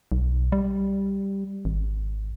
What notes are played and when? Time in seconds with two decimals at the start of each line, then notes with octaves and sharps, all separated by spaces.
0.12 B1
0.52 G3
1.65 G#1